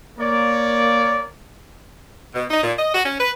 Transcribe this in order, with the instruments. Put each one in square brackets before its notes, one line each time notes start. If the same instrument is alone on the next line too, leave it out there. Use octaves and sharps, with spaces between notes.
[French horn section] A#3 [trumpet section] A#4 C#5 D5
[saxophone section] B2
D#4
A#2
D#5
F#4
C#4
B4